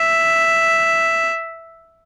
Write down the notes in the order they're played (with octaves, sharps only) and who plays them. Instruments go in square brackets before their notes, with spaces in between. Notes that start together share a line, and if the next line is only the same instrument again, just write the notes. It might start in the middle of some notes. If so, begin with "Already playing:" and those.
Already playing: [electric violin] E5